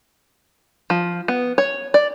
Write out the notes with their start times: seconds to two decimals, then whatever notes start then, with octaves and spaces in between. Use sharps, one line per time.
0.90 F3
1.28 B3
1.58 C#5
1.94 D5